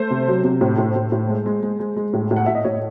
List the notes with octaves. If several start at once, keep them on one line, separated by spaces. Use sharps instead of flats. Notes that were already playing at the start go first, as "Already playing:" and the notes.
Already playing: A3 C5
C3
F#3
C3
A2 C5
A2
A2
A2
G#3
G#3
G#3
G#3
G#3
A2
A2
F#5
A2 E5
D#5
A2 C#5